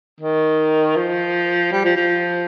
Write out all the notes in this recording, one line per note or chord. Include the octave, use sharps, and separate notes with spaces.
D#3
F3
G3
F3
F3